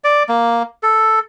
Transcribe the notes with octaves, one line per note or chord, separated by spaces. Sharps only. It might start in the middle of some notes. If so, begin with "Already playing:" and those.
D5
A#3
A4